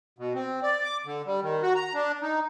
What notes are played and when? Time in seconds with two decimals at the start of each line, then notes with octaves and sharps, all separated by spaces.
0.19 B2
0.35 C4
0.63 D5
0.84 D6
1.05 D3
1.26 G3
1.43 D#3
1.63 F#4
1.75 A#5
1.94 D4
2.22 D#4